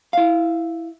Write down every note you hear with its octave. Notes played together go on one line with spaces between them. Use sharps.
E4 F5